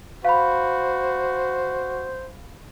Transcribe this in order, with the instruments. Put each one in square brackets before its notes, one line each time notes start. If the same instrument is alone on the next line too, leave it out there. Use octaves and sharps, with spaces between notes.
[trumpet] F#4 [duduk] C5 [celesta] F5 B5